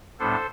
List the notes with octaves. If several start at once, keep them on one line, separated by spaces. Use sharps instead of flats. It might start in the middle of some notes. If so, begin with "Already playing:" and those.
A2 G3 B3 D4 A4 C5